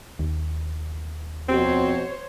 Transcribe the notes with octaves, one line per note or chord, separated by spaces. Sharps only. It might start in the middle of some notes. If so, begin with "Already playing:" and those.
D#2
F2 B2 C4 F#4 C5 C#5